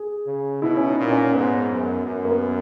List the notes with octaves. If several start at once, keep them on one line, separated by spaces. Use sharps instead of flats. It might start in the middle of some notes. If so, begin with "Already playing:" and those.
Already playing: G#4
C#3
B2 E4
C#4
D#4
A#2
C#4
G#2 B3
F#2
F#2
A#3
B3